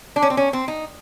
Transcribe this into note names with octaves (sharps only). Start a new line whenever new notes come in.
D4
C#4
C4
C#4
C4
D#4